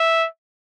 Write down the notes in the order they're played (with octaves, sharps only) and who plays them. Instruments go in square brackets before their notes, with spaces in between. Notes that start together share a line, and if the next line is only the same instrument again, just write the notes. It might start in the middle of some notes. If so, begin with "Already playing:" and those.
Already playing: [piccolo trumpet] E5